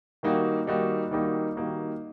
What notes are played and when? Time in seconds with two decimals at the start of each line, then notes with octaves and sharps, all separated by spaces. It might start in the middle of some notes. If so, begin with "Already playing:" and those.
0.23 D#3 G3 A#3 D#4 F#4
0.67 D#3 G3 A#3 D#4 F#4
1.11 D#3 G3 A#3 D#4 F#4
1.56 D#3 G3 A#3 D#4 F#4